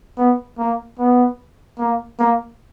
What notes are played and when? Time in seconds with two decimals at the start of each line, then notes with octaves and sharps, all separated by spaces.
0.18 B3
0.58 A#3
0.99 B3
1.79 A#3
2.19 A#3